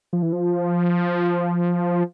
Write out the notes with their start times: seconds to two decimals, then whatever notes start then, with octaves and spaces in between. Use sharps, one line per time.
0.13 F3
0.22 E3
0.32 F3